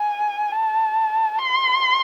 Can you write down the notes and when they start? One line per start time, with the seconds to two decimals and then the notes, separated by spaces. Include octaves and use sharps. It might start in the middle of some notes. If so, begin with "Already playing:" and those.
Already playing: G#5
0.52 A5
1.39 C6